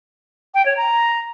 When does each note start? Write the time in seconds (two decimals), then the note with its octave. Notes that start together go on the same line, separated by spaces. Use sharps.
0.54 G5
0.66 C#5
0.77 A#5